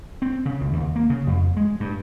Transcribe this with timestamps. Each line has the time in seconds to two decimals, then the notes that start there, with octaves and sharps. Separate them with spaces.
0.22 C4
0.46 C#3
0.61 C#2
0.73 D#2
0.96 A#3
1.10 C#3
1.27 F2
1.57 G#3
1.80 G2